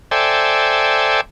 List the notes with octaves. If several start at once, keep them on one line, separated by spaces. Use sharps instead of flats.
A4 C5 D5 E5 G5 G#5